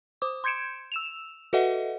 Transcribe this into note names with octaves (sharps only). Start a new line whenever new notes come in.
C5 D6 D#6
C6 G6 G#6 C#7 D7 E7
E6 E7 F7
F#4 A4 B4 D#5 E5 F#5